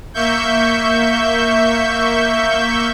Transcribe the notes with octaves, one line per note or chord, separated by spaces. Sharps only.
A#3 E5 C#6 G6